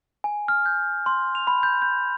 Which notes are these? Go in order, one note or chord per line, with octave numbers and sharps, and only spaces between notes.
G#5
F6
G6
C6
F7
B5
G6
G6